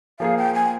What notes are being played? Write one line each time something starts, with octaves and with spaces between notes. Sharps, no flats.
F3 A#3 F4 G#4 F5
G5
G#5